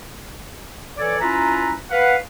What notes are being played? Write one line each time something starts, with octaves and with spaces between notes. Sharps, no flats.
E3 A4 C#5 D5
C#4 E4 F4 B4 E5 A#5
B4 F5 F#5